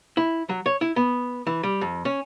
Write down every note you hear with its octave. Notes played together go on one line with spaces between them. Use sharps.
E4
F#3
C#5
E4
B3
E3
G3
F2
C#4